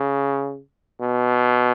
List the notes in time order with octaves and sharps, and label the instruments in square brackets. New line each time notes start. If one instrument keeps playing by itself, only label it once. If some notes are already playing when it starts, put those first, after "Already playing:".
Already playing: [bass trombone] C#3
B2